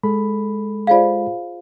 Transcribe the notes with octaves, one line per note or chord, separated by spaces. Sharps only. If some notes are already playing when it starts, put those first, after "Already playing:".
G#3 A4 B5
F4 G#4 C5 D5 F5